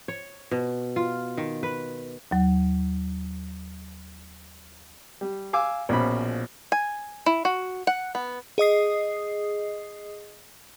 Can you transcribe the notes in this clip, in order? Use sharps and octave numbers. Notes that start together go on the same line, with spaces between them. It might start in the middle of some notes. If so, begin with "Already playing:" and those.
C#5
B2
F4
D#3
B4
D#2 F#3
G3
F5 G#5 D6 E6
A#1 B2 F3 C#4 B5
G#5
E4
F#4
F#5
B3
G#4 D#5 D#6 C7